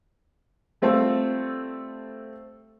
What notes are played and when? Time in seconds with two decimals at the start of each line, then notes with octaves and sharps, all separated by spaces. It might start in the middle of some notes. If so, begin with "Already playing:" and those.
0.82 G3 A3 C4 F4 A4